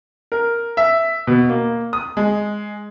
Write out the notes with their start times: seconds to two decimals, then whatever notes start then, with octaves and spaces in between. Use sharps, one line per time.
0.32 A#4
0.77 E5
1.27 B2
1.49 A#3
1.93 D#6
2.17 G#3